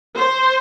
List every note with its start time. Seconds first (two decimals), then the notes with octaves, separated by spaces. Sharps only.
0.15 C5